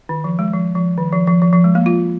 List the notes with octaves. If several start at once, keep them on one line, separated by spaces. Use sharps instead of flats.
D#3
F3
G#3
F3
F3
D#3
F3
F3
F3
F3
G#3
A#3
F4